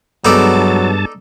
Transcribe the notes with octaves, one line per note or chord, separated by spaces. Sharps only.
G2 F#3 G#3 B3 D#4 A4 D5 A5